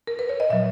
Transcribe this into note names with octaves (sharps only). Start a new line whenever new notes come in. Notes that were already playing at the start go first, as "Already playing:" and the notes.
A#4
B4
C#5
D#5
A#2 F#3 E5